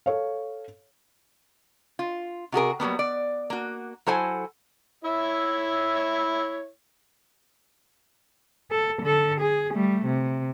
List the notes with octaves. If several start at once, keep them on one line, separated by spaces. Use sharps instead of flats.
A4 C#5 F5
F4
C3 F#4 G#4 A#4
F#3 G3 A#3 B3
D5
A#3 F#4
F#3 E4 A4 C5 F#5 G#5
E4 C#5 E5
A4
D3 A4
G#4
G3 A3
C3